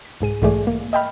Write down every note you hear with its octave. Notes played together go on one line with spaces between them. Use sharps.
B6
C2 G#2 G#4 D#7
B1 G#2 E3 A3 G#4 D5
A#3
D#5 E5 G5 A5 B5 F6